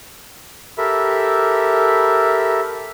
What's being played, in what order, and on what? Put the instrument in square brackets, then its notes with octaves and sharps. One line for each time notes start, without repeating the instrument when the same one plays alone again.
[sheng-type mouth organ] G4 A4 A#4 E5 B5